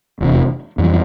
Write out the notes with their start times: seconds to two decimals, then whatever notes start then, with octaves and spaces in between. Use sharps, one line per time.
0.21 F1 E2 C3
0.78 F2 E3 G3